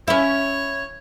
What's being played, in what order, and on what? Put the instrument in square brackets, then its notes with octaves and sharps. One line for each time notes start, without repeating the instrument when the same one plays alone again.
[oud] C#4 E4 [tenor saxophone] C#5